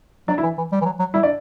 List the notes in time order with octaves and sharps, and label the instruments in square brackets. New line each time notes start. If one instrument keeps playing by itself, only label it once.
[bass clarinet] F#3 [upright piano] D4 D5
[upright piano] E4 E5
[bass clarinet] E3
E3
G3
E3
F#3
F#3
[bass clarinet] G3 [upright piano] E4 E5
[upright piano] D4 D5